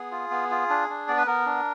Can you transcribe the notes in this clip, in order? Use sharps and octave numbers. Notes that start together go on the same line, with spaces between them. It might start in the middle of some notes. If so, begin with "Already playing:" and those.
Already playing: B3 G#4
F4
B3
F4
D4
D4
B3 D5
B4
B3 A#4
D4